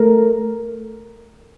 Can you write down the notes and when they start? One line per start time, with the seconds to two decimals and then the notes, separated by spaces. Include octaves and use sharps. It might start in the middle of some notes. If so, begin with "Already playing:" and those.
Already playing: A3 A#4